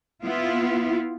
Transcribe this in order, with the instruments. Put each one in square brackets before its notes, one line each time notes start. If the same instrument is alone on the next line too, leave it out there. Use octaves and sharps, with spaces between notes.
[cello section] B3 E4 F4